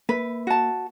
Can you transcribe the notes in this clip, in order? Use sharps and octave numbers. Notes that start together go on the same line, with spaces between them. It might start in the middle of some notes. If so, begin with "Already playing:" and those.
A#3 B4
F#4 A5